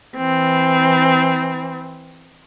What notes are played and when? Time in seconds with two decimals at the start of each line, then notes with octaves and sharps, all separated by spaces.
0.16 E3 C4